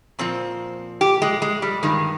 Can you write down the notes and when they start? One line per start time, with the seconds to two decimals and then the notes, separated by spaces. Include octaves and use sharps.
0.19 A#2 F3 C4
1.01 G4
1.22 G#3
1.42 G#3
1.62 G3
1.83 G2 D#3 G#3